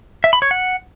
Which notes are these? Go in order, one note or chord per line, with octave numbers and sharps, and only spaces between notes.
E5
B5
C#5
F#5